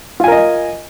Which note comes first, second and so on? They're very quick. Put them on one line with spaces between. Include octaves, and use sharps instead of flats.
F4 G#5 A#4 D#5